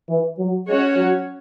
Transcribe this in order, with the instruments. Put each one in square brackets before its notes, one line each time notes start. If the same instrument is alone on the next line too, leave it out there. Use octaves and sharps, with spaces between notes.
[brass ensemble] E3
F#3
[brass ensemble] G#3 [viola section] C#4 F#4 C#5
[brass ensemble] F#3